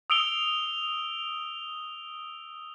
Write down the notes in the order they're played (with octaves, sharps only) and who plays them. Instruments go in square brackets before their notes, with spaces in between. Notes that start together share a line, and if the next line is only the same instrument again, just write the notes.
[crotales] D#6 E6 D7 F7 G7